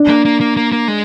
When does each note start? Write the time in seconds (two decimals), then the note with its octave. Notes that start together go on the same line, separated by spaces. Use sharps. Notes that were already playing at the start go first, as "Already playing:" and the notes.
Already playing: D4
0.09 A#3
0.25 A#3
0.41 A#3
0.57 A#3
0.73 A#3
0.88 G#3